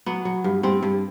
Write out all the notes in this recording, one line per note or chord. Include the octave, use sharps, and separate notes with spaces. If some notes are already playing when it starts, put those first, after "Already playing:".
F#3 B3
F#3
G2
G2 C4
G2